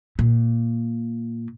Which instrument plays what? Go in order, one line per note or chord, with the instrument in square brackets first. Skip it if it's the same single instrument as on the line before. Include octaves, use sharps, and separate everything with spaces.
[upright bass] A#2